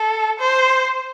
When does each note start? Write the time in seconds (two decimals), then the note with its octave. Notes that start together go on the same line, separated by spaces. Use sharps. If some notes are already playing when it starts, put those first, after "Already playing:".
Already playing: A4
0.39 C5